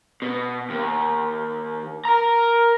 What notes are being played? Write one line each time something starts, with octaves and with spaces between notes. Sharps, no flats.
B2
D#2
A#4 A#5